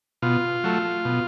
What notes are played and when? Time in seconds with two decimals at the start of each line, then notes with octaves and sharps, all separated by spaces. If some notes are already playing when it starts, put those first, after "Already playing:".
0.22 B2 F4
0.64 F#3 A3
1.05 B2